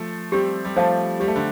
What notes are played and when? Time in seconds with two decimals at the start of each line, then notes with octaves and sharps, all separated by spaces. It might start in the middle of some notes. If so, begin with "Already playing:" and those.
Already playing: F3 A3
0.32 G3 C4 G4
0.65 G3
0.76 F3 A3 C5 F5 A5
1.20 G3 G4
1.28 A3
1.36 D3 G3